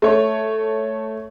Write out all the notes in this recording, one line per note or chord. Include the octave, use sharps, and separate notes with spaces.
A3 C#5